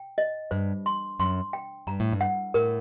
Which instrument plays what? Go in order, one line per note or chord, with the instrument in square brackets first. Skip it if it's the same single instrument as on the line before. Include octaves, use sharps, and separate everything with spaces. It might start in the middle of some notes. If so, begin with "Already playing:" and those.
Already playing: [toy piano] G5
D#5
[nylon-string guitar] G2 [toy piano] C5
[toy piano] C6
[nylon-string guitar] F#2 [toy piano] C6
[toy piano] G5
[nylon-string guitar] G2 [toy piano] A#5
[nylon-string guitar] A2
G2
[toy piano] F#5
[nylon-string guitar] A2 [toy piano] A#4